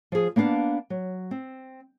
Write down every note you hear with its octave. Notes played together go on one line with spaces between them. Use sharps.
F3 G#4
A#3 B3 D4 F5 A5
F#3
C4